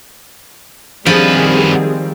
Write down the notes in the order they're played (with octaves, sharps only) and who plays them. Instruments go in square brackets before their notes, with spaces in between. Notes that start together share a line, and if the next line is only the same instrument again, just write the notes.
[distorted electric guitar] F#2 B4 [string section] D#3 G3 C4 [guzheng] F3 [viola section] G#4